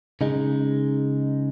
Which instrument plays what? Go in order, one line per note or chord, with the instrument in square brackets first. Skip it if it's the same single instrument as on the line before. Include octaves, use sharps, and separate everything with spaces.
[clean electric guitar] C#3 G#3 D#4